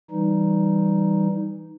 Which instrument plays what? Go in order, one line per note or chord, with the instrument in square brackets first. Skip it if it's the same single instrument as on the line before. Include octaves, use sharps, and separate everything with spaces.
[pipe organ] E3 G3 D#4